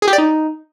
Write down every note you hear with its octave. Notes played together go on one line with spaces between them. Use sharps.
G#4
G4
D5
D#4